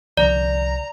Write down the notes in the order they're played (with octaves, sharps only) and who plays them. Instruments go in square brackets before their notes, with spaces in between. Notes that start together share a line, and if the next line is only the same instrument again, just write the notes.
[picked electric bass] C2 D3 F3 [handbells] D5 [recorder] A#5